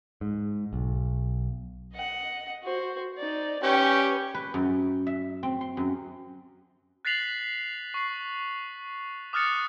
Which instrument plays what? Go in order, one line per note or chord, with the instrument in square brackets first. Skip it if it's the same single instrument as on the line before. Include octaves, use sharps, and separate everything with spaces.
[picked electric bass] G#2
B1
[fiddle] D#5 F#5
F#4 C5
D#4 D5
[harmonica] C#4 G4 G5 [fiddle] B4 C#6
[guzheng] B4
F#2
E5
C4
C6
F#2
[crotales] F#6 A6 B6 C7 F7 F#7
C#6 C7
D6 D#6 F6 F#6 A6 C#7